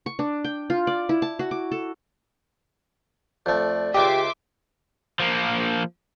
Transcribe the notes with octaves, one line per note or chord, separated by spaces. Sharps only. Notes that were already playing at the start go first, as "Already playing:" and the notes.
C#6
D4
G5
F4
D5
E4
A5
F#4
D6
A4
F2 A3 D5
C#2 G4 D#5 E5 C6 D6
F3 A#3